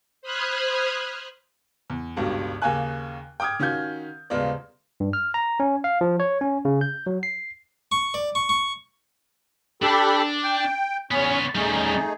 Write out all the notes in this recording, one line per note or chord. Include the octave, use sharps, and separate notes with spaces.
C5 B5 D#6 F6 F#6 G#6
E2
G1 C#2 G2 B2
D#2 C#3 A#3 F5 G#5 F#6
G5 D6 D#6 F6 G#6
D#3 C#4 F4 F#4 G6 G#6
D#1 C#3 G#3 B3 F4 D5
G2
F6
A#5
C#4
F5
F3
C#5
C#4
C#3
G6
F#3
C7
C#6
D5
C#6
C#6
D4 G4 A4 B5
G5
E2 B3 C#4 C#5
G3 A3 C#4 D#4 G#4